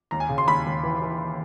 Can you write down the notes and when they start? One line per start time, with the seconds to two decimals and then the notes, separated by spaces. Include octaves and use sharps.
0.11 D#2 A#5
0.20 G#5
0.29 C#3
0.38 C6
0.47 D#2 B5
0.66 D#2
0.83 E3
1.02 E3